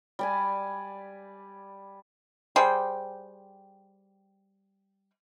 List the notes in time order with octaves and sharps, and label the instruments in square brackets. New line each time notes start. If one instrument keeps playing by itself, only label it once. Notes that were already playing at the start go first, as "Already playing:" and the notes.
[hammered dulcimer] G3 D5 G#5
[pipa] G3 G#4 C5 G5